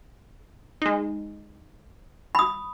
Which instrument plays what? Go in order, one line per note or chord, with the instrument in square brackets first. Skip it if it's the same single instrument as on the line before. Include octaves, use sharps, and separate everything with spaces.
[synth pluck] G#3 D#4
[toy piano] B5 D#6